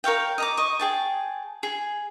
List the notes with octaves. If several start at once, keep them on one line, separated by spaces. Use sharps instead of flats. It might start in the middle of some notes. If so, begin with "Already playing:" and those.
A#4 C#5 F5 G5
D#5 A#5 D6
D#5 C#6
G#4 G5 A5
G#4